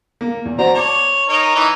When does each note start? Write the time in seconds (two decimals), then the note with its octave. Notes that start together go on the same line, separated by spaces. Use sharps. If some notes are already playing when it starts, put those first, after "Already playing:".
0.21 A#3
0.45 E2
0.59 F#4 C5 D5 A#5
0.74 C#5 A5 D6
1.29 D#4 A#4 C#5
1.55 E3 D#4